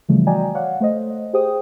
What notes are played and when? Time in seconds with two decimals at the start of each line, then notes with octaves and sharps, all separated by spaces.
0.09 C#3 E3 F3 G3 A3
0.27 F#4 D5 D#5 G5 G#5 A#5
0.55 C#5 D5 F5 F#5
0.80 A3 C5 D#5
1.33 G4 G#4 C5 G5 D#6